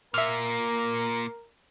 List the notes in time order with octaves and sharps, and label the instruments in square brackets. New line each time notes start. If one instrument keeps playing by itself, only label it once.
[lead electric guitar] A#2 A#3 [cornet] A#4 [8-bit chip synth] E5 F6